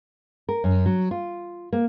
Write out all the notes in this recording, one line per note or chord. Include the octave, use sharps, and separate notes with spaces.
A#4
F#2
F#3
F4
A#3